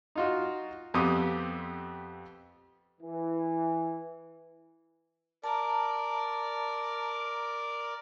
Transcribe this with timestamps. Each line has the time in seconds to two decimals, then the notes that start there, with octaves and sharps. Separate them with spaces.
0.15 D#4 F4 F#4
0.94 F2 B3 C4 G4 D#6
3.01 E3
5.44 A#4 D5 A5 A#5